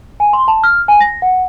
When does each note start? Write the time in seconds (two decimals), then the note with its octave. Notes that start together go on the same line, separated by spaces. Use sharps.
0.20 G#5
0.33 C6
0.48 A5
0.64 F6
0.88 G#5
1.01 A#6
1.22 F#5